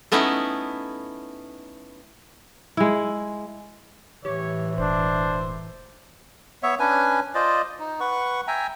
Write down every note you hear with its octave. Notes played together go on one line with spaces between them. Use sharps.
A3 B3 C#4 D#4 E4
G#3 E4
A2 E3 G4 C#5
E1 D4 C5
B3 C#5 E5
C#4 D4 B4 G#5
F4 C5 D5 D#5
D#4
B4 F#5 C#6
E5 G5 G#5 A#5